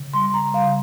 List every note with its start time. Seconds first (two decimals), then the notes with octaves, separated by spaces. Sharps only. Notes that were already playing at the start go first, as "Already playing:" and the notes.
Already playing: C#3
0.14 G3 C6
0.34 G3 A#5
0.54 C#3 F5